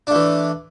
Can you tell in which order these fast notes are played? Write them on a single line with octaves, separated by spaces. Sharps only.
D4 A3 E3